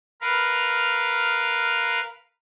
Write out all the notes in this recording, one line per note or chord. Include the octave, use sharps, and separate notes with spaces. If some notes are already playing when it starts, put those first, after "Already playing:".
A#4 B4 F5